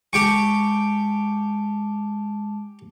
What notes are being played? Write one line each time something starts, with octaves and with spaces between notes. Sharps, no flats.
G#3 G4 G5 A5 C#6